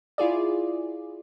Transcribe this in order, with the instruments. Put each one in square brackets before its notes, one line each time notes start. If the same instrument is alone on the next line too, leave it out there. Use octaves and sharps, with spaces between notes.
[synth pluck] E4 F4 G#4 D5